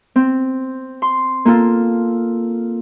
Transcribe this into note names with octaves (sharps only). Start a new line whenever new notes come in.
C4
C6
A#3 F4 A4